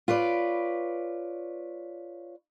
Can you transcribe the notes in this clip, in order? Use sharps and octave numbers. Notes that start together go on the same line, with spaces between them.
F4 B4 C#5 D5